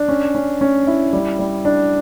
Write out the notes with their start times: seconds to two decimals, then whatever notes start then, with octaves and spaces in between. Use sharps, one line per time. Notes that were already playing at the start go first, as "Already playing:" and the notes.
Already playing: D4
0.09 C#4
0.35 C#4
0.61 C#4
0.87 E4
1.13 G3
1.39 G3
1.65 D4